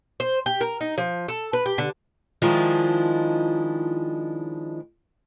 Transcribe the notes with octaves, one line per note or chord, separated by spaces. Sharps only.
C5
G4
A#4
D#4
F3
A4
B4
G4
D3
D#3 F3 G#3 D4 E4 F4